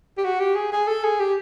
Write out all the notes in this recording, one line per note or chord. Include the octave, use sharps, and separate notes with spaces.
G4
F#4
G4
G#4
G#4
A4
G#4
G4